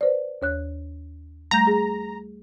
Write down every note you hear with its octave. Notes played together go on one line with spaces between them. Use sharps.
B4 C5 D5
D#2 C#5 F#6
G3 A3 A#5 G6
G#4